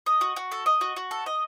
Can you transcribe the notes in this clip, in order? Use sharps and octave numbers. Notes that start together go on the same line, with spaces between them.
D#5
F#4
F#4
A4
D#5
F#4
F#4
A4
D#5